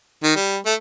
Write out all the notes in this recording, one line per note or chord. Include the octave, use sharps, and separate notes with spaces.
D#3
G3
A3